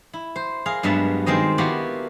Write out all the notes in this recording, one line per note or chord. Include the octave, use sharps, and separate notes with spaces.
E4
C5
G#4 A#4 F5
G2 F#3 G#3 B3 E5 A5
D#3 G#3 C4 C5 D#5
A#3 B3 E4 F#4 G4 A4